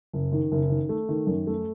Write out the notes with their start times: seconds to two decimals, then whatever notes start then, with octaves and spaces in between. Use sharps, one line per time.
0.13 F#1
0.32 D#3
0.52 F#1
0.70 D#3
0.89 A3
1.09 D#3
1.27 F#2
1.47 A3